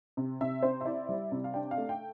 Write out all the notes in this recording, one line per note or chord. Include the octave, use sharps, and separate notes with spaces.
C3
C3 E5
C4 C5
E5
E4 D5
G3
C3
F5
D4 G5
F5
A3
G5